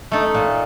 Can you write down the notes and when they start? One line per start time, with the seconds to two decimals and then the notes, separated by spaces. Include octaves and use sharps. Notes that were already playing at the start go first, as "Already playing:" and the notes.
0.12 A3 D#4 A4
0.34 A#2